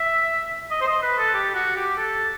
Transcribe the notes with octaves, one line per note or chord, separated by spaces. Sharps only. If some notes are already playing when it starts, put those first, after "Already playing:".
Already playing: E5
D#5
C5
D#5
B4
A4
G4
F#4
G4
A4